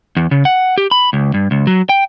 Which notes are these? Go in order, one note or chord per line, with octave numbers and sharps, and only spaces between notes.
E2
C#3
F#5
G4
B5
C#2
G2
C#2
F#3
G5